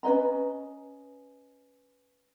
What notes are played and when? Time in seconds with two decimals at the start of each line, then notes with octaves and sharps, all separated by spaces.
0.03 C#4 B4 D#5 A#5